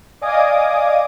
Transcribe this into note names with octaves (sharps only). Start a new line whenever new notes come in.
D5 D#5 F5 G#5 D6 D#6